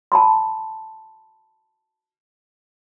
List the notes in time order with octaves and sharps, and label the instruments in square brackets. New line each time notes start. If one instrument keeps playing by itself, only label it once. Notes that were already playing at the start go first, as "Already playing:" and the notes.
[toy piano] A5 B5 C6